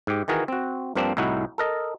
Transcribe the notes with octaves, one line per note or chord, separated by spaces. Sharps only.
G#2 G4
D#3 E3 F#4 G#4 A#4
C4 F#4
G2 F3 A#3 C4 D4
C2 A2 D#4 E4 F#4
A4 A#4 D#5